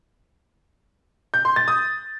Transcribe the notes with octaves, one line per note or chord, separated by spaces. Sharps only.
G6
C6
A6
D#6